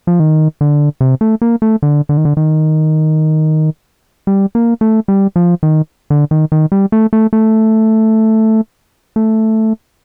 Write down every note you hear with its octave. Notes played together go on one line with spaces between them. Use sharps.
F3
D#3
D3
C3
A3
A#3
A3
D3
D3
D#3
D3
D#3
G3
A#3
A3
G3
F3
D#3
D3
D#3
D#3
G3
A3
A3
A3
A3